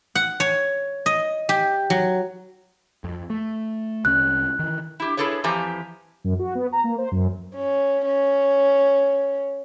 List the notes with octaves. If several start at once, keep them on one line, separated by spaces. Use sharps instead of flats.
F#5
C#5
D#5
G4
F#3
F2
A3
C2 C#4 F#6
D#3 E3
E4 G4
E4 G#4 A4 B4 C#5
F2 E3 F3 G4 G#5 A#5
F#2
F#4
B3
A#5
A#3
C5
F#2
C#4
C#4